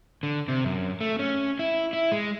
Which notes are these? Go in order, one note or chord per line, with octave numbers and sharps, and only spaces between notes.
D3
C3
F#2
A3
C#4
E4
E4
G#3